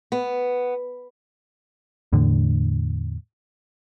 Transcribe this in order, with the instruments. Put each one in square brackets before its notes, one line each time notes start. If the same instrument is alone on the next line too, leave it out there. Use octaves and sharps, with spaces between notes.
[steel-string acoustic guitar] B3
[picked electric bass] E2 A2 D3